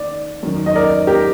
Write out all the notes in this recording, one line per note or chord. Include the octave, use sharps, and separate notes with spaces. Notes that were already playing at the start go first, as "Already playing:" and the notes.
Already playing: D#3 D5
F#2 D#3
D#5
A#4 D5
G4 A#4